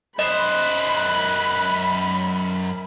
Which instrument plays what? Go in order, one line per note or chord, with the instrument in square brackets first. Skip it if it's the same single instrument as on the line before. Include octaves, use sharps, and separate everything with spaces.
[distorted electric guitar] F#2 C5 [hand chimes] D#5 [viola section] B5 [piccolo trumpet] F#6